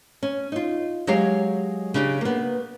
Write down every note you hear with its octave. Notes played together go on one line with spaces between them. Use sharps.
C#4
D#4 F4
F#3 G#3 G4 C#5 F5
C#3 D4 G4
A#3 B3